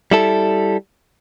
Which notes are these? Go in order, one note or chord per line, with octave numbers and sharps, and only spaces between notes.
G3 E4 A4